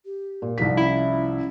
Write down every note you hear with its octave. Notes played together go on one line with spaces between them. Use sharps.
G4
A#2
C2 F3 D#4 B6
C#4 E4